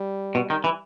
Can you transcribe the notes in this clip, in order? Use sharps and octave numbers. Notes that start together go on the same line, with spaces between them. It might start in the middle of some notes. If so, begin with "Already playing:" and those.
Already playing: G3
B2
D#3
E3